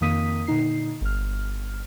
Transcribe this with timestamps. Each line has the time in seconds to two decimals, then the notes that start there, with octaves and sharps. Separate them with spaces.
0.01 F2 D#3 A#3 D#6 B6 D#7
0.47 A#2 D3 D#4 C7
1.01 G1 F6